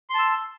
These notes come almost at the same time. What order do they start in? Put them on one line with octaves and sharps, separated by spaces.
C6 A5 E6